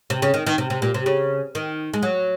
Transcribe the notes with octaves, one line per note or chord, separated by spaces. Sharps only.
C3
C#3
D#3
D#3
C3
C3
A#2
C3
C#3
D#3
G#3
F#3